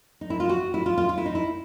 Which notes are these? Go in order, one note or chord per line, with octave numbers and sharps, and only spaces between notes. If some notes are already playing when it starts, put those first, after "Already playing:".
D#4
E4
F4
F#4
E4
F4
F4
F4
E4
D#4
E4